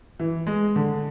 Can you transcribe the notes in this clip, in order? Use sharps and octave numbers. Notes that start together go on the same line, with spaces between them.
E3
G#3
D3